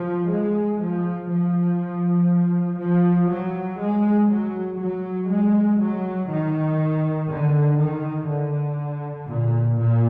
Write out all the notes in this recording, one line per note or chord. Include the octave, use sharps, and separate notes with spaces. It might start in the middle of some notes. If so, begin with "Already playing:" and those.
Already playing: F3
G#3
F3
F3
F3
F#3
G#3
F#3
F#3
G#3
F#3
D#3
D3
D#3
D3
A#2
A#2